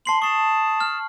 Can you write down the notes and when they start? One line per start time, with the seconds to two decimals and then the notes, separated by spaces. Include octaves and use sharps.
0.06 A5 C6 C7 F#7
0.22 A5 C#6 D#6 C7
0.80 F6